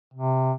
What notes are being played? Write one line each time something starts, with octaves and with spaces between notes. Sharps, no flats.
C3